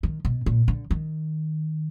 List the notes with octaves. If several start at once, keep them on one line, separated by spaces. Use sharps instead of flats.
D#3
B2
A#2
D3
D#3